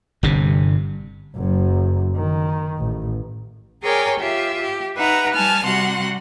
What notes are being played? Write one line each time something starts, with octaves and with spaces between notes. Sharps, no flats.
G1 G2 C3
F#1 F#2
D#3
A1
G#4 A#4 C#5 D5 G5 G#5
F4 G4 E5
G4
D#4 B4 E5 F#5 A#5
G3 G#5 A5 F6
C3 G3 F#4 F#5 C6